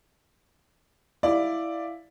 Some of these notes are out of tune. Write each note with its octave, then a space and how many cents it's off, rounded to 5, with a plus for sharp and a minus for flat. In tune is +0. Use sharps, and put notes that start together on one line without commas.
E4 +0 D5 +5 F5 +0